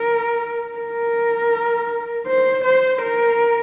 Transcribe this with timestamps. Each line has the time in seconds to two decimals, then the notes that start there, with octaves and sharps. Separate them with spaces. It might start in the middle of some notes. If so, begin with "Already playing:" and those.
Already playing: A#4
0.77 A#4
2.27 C5
2.65 C5
3.02 A#4